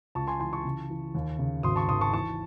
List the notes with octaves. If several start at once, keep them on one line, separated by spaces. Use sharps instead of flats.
C#2 A5 C#6
G#5 C6
E3 G#5 C6
A5 C#6
C#3
E3
D#2
C#3
G#1 C6 D#6
A5 C#6
G#1 C6 D#6
A5 C#6
E3 A5 C#6